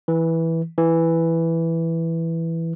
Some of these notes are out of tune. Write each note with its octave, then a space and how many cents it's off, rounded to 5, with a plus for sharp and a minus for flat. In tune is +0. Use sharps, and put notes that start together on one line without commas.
E3 -10
E3 +0